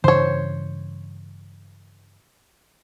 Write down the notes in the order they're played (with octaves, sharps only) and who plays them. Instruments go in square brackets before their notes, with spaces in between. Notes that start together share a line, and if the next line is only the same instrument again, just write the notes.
[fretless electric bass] G2 C#3 E3 [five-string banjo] C5 C#5